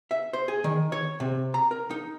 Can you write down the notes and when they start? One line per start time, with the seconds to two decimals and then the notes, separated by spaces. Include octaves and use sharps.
0.11 E5
0.33 C5
0.48 G#4
0.64 D#3
0.92 C#5
1.20 C3
1.54 A#5
1.71 A#4
1.90 D#4